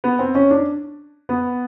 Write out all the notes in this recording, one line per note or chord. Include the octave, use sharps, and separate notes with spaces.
B3
C4
C#4
D4
B3